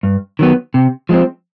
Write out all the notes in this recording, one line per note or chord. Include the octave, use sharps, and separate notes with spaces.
G2
D#3 F#3 B3
C3
F3 G#3 C4